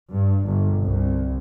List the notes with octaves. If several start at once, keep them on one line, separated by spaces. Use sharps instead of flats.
G2
G1
C2